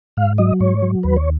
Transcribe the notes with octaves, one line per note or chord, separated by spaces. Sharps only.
G#2 F5
F#3 D#5
G#2 C#5
F#3
D#2 B4
C#5